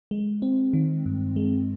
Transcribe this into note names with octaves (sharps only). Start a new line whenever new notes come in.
G#3
C4
D#3
G2
G#3